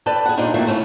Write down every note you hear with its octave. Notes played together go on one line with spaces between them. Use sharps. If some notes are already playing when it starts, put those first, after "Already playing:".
A4 B4 D5 G5 A5
G#4 F#5
A#2 G3 D4 D#4 F4
D#3 E3 F#3 A3 A#3
E2 C#3 A3 B3 C#4